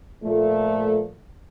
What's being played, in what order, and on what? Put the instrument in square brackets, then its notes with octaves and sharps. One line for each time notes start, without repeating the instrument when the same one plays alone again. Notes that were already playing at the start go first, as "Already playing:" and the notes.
[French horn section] A#2 F3 A3